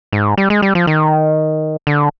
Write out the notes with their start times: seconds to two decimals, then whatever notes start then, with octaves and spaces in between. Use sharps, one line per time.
0.13 G#2
0.38 G3
0.50 G#3
0.62 G3
0.75 F3
0.87 D#3
1.87 D3